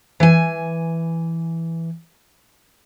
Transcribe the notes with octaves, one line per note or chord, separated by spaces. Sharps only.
E3 G#5